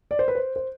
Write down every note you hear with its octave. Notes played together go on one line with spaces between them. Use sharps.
D5
C5
B4
C5
C5